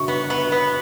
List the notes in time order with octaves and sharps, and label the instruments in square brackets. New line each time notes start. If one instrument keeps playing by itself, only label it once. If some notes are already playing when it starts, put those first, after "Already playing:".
Already playing: [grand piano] C#6
[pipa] B3
B3
B3